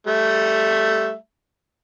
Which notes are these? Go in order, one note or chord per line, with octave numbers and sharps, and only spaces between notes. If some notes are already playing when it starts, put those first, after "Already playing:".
G3 A3 E5